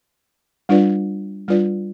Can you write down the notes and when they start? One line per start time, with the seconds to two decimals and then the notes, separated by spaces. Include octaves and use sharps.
0.69 G3 D4 F4 B4 D5
1.48 G3 D4 F4 B4 D5